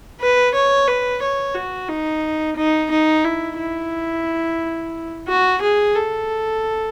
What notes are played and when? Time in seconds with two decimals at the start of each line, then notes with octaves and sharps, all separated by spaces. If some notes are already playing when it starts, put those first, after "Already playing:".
0.20 B4
0.54 C#5
0.88 B4
1.22 C#5
1.55 F#4
1.89 D#4
2.56 D#4
2.91 D#4
3.24 E4
3.58 E4
5.27 F#4
5.62 G#4
5.95 A4